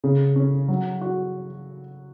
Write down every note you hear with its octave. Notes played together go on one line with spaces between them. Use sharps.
C#3
C#4
F#3
F#4